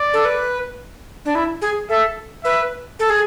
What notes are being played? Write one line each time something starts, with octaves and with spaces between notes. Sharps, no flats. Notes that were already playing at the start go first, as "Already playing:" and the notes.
Already playing: D5
A4
B4
D4
E4
G#4
A4 E5
B4 E5
A4
G#4